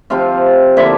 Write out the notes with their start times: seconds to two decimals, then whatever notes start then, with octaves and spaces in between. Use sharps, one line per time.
0.10 C3 F3 C4 F4 F5
0.77 D3 F3 A#3 E4 E5